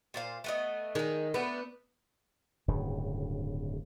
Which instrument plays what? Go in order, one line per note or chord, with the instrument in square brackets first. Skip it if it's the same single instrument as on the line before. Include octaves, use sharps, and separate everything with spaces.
[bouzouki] A#2 C5 F5
A3 B3 D#5
[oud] D#3 [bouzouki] G#3 D#4
[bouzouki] A3 D4 F#4 [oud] B3
[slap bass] D1 G2 C#3